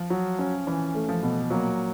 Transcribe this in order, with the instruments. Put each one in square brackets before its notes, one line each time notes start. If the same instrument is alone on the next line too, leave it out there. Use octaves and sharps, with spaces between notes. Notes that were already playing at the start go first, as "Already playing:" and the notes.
Already playing: [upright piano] F3
[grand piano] F#3
C#4
[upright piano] E3 [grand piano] C#4
[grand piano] A3
[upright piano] F3
[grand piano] B2
[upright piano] A#2 A#3 [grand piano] F#3